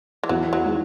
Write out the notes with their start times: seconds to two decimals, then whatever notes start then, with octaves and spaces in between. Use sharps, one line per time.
0.23 E3
0.29 E2 F#3
0.53 F#3
0.64 D#3 G#3